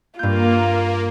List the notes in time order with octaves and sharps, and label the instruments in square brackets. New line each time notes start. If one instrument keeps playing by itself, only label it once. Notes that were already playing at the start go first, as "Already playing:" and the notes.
[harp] G2 G6 [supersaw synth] A#3 [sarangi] F4